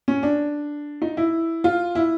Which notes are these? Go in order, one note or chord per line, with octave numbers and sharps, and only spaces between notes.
C#4
D4
D#4
E4
F4
E4